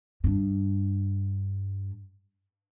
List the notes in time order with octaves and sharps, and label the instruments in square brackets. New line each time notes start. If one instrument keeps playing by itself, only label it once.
[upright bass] G2 D4